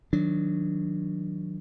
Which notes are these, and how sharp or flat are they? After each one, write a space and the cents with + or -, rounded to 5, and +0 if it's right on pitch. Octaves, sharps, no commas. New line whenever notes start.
D#3 +15 F#3 -10 D4 +0